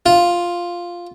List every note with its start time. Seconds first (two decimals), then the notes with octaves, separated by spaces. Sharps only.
0.06 F4